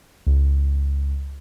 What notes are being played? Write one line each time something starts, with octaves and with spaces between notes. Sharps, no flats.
C#2